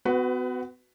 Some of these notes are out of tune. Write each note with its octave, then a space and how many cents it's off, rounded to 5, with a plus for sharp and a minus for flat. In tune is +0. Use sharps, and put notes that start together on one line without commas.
B3 +40 F#4 +0 B4 +15